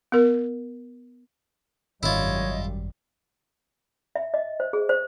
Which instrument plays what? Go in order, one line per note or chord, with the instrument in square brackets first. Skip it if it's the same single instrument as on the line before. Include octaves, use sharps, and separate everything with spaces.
[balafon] B3 A#4
[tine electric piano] G#1 [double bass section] F#2 G3 [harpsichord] E4 F4 [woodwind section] C#5 D#5
[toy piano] E5
D#5
C5
G#4
C5